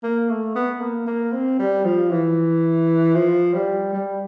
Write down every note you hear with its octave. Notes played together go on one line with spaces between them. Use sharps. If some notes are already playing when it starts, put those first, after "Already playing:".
A#3
A3
B3
A#3
A#3
C4
G3
F3
E3
F3
G3
G3